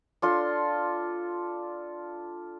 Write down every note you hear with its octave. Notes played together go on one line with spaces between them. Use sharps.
D4 F4 A4 C6